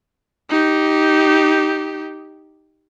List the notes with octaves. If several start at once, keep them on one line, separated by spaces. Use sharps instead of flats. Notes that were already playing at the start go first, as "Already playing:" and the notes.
D#4 G4